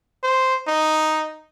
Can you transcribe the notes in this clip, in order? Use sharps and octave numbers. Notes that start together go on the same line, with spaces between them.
C5
D#4